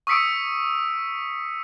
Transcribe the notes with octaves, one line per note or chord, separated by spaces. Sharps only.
C#6 D#6 E6 B6 C#7 D7